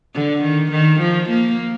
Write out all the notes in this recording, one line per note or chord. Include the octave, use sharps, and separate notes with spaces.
D3
D#3
D#3
F3
A#3